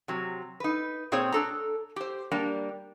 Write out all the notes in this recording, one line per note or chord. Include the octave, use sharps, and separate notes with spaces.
C3 F#3
D#4 B4
A#2 C4 G#4 C5 C#5
D4 A4 A#5
G4 C5
G3 A#3 D4